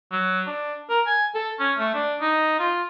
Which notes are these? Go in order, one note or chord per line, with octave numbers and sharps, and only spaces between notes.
F#3
D4
A#4
G#5
A4
C#4
A3
D4
D#4
F4